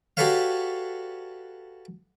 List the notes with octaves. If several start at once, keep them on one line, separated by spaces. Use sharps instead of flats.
F#4 G4 A4 B4 C#5 F5